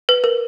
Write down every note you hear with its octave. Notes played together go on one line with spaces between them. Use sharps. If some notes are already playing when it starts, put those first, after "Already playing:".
B4
A#4